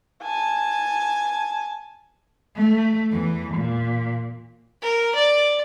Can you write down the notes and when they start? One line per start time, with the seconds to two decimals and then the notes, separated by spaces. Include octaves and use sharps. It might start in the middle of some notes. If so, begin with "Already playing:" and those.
0.23 G#5 A5
2.56 A3
3.12 E2 E3
3.55 A#2
4.82 A#4
5.15 D5